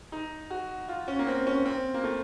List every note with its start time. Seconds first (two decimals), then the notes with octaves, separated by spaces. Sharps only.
0.12 D#4
0.50 F#4
0.89 F4
1.08 C#4
1.19 A#3
1.27 C4
1.47 C#4
1.65 C4
1.94 A#3
2.04 A3